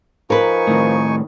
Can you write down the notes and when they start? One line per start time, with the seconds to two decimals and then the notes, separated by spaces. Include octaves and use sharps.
0.30 F3 D#4 A#4 B4 G#5 C#6
0.67 A2 D#3